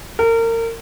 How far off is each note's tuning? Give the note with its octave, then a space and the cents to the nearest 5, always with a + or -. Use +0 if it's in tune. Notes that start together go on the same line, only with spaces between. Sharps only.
A#4 -30